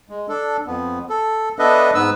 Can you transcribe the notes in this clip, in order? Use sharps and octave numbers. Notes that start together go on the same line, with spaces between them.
G#3
D4 A4
F2 B3
A4
B3 D4 A4 B4 D#5 E5
G#2 B3 B4 E6